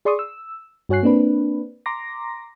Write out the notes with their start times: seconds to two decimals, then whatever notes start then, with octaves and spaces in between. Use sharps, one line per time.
0.05 G#4 D5 C6 C#6 D#6
0.19 E6
0.89 G2 F#4 C#5 G#5 F#6 C7
1.03 A#3 C4 D4 B4
1.86 A#5 C6 D6 A#6